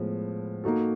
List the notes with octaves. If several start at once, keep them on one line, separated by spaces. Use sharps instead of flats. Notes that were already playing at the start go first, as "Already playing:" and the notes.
Already playing: A2 F3 G#3 B3
A#3 D#4 F#4 A4